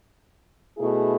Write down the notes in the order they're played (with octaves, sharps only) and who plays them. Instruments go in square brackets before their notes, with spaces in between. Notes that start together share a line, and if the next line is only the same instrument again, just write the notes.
[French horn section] B2 A3 E4 G#4